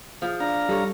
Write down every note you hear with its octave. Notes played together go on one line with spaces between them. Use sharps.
F3 G#4
D4 F5 A#5
G3 A4 C#5